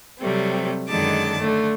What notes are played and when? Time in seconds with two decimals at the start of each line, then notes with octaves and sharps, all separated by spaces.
0.19 C3 F#3 G3 A3 C4
0.88 F#2 D3 D#3 G#3 A5 D6
1.39 D3 A3